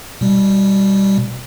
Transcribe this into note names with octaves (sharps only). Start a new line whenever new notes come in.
B2 G3